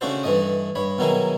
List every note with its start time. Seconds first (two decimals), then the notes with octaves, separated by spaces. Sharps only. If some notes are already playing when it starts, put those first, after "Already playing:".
0.01 C#3 A3 D4 F#4 A4 C5
0.23 G2 E3 A3 D#5 D#6
0.75 G2 C#5 B5
0.98 B2 D#3 F#3 D#4 E4 G#4